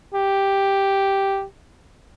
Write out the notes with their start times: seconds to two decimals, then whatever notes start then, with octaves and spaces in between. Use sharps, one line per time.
0.14 G4